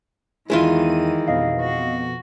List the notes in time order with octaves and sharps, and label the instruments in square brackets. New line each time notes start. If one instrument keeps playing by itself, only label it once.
[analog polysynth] E2 D#7 [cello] D#3 E3 [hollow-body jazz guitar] G#3 E4 F4
[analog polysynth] F2 B2 [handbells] D#5 F5
[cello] F#4